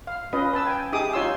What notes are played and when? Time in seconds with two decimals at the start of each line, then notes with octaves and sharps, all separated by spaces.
0.07 F5
0.33 C#4 F4 B4 D#5
0.53 B4 A5 E6
0.66 G5 G#5
0.92 D#4 G4 G#4 E5 D6 D#6
1.13 D#4 F4 C#5 C6 E6